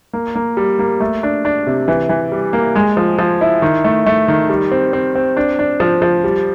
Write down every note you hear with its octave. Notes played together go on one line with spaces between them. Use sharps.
A#3
A#3
G3
A#3
A3
D4
D4
C3
E3
E3
G3
A#3
G#3
F3
F3
E4
D#3
A3
A3
D#3
G3
C4
C4
C4
D4
D4
F3
F3
G3